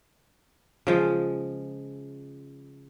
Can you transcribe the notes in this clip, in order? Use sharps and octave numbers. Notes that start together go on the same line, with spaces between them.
C#3 F3 G#3